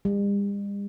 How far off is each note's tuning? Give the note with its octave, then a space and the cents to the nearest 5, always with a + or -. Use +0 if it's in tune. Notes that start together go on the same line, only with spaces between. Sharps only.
G3 +45